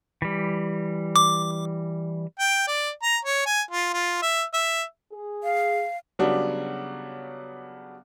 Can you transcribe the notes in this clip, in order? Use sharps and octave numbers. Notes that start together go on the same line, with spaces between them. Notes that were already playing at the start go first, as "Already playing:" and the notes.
E3 G3
D6
G5
D5
A#5
C#5
G#5
F4
F4
E5
E5
G#4
F5
C#3 F#3 G3 B3 D4 F#4